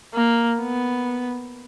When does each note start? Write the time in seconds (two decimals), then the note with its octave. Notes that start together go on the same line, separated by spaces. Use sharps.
0.14 A#3
0.61 B3